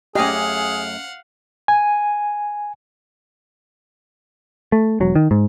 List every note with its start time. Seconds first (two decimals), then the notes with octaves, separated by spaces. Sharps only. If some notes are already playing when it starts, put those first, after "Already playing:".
0.15 F#2 A3 C#4 G4 G#4 D#5 F5 F#5
1.68 G#5
4.72 A3
5.00 E1 F#3
5.16 D#3
5.31 G#2